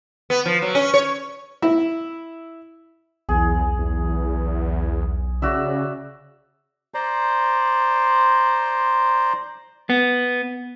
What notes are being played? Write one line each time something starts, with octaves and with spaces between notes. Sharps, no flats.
B3
F3
F#3
C#4
C#5
E4
B1 E2 G#4
E2
C#3 F#4 D5 E5
C5 D5 A#5 C6
B3